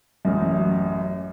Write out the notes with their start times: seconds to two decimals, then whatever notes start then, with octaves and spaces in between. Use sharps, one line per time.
0.25 A1 F#2